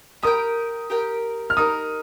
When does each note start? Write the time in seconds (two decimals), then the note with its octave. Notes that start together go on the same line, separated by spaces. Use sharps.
0.23 G4 A#4 G5 D#6
0.90 G4 A#4 G5
1.50 F6
1.57 D#4 G4 A#4 D#6